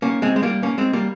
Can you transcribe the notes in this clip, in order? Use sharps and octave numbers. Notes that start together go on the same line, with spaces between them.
A#3 C#4
G#3 C4
G#3
G3 A#3
A#3 C#4
G#3 C4
G3 A#3